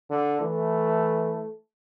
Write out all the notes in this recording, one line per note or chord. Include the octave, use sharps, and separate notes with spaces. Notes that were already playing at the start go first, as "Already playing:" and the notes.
D3
E3 A3